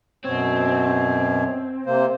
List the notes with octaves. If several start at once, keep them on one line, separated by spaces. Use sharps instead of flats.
F#2 B2 C4 C#5
C3 A#3 C5